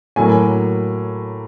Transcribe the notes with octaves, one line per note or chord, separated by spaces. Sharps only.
A2 F#3 A#3 G#5